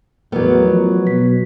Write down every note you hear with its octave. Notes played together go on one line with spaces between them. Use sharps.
E2 F#3 A3 B3 A#4 B4
F3
B2 B6